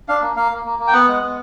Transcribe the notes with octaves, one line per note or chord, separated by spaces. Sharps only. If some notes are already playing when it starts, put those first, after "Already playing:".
D4 F5
A#3
A#3 F5
A#3
A#3
A#3
G5
B3 F#5
G#3
B3